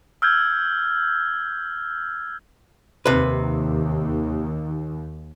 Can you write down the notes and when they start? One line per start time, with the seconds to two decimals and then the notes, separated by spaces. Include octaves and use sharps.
0.22 E6 F6 G6 G#6
3.06 D#2 C3 B4